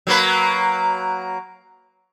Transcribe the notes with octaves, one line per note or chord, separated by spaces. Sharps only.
F#3 A#3 B4